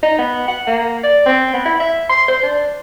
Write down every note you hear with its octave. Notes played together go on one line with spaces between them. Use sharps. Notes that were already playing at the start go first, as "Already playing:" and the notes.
D#4
B3
F#5
A#3
D5
C4
B3
E4
E5
C6
C5
D4